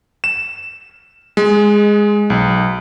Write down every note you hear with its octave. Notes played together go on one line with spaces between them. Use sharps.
E7
G#3
B1